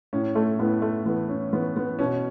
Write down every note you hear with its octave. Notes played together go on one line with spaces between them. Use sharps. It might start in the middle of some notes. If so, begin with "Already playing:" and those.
A2 C#4
A3
A2 B3
A3
E3 B3
C#4
E3 B3
B3
B2 C#4